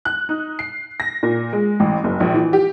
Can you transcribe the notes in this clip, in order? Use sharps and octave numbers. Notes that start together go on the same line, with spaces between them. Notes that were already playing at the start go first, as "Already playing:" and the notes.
F#6
D#4
C7
A#6
A#2
G#3
A1
F#1
A#1
E3
G4